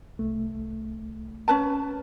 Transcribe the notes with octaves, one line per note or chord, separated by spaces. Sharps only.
C2 A3
C#4 B4 A5